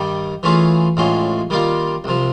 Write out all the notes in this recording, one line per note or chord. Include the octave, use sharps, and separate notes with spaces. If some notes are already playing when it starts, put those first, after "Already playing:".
Already playing: G2 D#3 G3
E3 A3 C#4 F4 G#4
A1 A2 F3 G#3 C#4
D#3 G3 A#3 D4 F4
C2 C3 F3